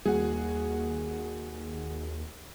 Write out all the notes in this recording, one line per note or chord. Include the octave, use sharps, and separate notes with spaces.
D#2 G3 A#3 F#4 G#4